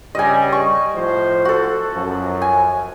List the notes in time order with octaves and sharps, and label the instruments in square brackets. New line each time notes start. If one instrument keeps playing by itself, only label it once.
[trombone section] G2 C#3 G3 [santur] D#5 G#5
[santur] C#6
[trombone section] A2 F3 C5
[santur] F#4 A4
[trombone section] F#2 F3
[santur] G#5